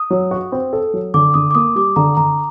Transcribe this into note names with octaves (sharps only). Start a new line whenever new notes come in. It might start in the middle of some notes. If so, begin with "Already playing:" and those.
Already playing: D#6
F#3
F#4
C4
A4
F#3
D3 D6
D3 D#6
D6
A#3 D#6
G3 D6
D3 A#5
D3 A#5